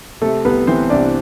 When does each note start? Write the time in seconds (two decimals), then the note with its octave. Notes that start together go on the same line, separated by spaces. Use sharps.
0.22 C3 A3 A4
0.44 C2 B3 B4
0.67 E3 C4 C5
0.90 C2 D4 D5